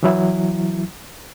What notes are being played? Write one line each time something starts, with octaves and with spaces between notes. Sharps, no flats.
E3 F#3 E4